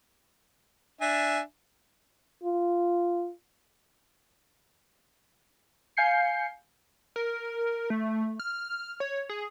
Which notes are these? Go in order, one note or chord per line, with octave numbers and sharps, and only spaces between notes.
D4 E5 G#5
F4
F5 G#5 G6 C7 C#7
A#4
A3
F6
C#5
G#4